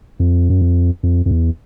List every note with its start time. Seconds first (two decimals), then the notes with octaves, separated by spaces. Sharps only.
0.20 F2
0.50 F#2
0.62 F2
1.03 F2
1.26 F2
1.31 E2